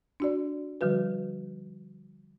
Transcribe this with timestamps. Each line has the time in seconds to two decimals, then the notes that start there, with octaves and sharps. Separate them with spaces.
0.20 D4 F#4 D5
0.81 D3 F3 G3 F#4 B4